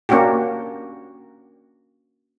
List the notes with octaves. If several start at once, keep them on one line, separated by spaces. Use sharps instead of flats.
A#3 C#4 D4 F#4 G4